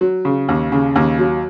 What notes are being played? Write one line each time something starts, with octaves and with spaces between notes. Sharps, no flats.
F#3
C#3
D#2
C#3
D#2
F#3